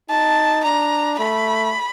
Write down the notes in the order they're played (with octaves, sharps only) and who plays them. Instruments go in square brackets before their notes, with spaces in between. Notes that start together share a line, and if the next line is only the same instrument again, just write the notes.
[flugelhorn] D#4 [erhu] A5
[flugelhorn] D4 [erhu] A#5
[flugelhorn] A3 [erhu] B5